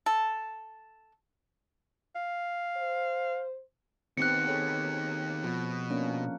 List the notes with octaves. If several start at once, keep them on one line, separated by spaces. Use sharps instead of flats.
A4
F5
C5
D#3 B3 C4 G4 F#6 C#7
G#4 A4 C#5
B2 F3
A#3 C#4 D4